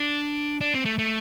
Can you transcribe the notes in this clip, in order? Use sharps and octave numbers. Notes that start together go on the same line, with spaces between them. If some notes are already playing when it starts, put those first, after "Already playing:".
Already playing: D4
D4
C4
A3
A3